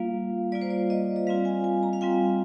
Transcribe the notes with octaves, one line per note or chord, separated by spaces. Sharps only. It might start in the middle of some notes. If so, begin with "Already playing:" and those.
Already playing: G3 A#3 F4 F5
G3 A#3 F4 D5
C5
D5
D#5
D#5
G3 C4 F4 F5
G#5
G#5
A#5
F5
G3 C4 F4 G5